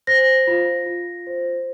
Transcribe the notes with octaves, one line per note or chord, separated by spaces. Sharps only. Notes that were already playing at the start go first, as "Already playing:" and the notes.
C5 A#6
F4
F4
C5